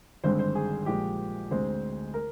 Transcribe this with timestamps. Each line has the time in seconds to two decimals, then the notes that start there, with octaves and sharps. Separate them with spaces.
0.24 G#1 G2 D3 G#3 C4 C5
0.39 C5
0.55 G#4
0.86 A#1 A#2 G#3 G4
1.50 D2 D3 G#3 C4 C5
2.14 A#4